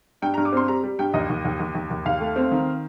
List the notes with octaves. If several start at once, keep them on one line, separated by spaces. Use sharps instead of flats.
G2 G5
A#5
G2
D6
C4 C6
G3 A#5
G3
G2 G5
D#2 D#5
D#2
D#2
D#2
D#2
D#2
D#2 F5
A3
C4
D#3